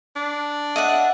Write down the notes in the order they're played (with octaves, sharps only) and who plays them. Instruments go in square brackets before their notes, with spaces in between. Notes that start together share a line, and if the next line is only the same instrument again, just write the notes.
[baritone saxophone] D4
[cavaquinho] D#5 E5 F#5